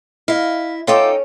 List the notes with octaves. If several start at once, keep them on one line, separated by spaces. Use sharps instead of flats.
E4 D#5 F5
C#4 D#4 F4 A4 E5 G5 D6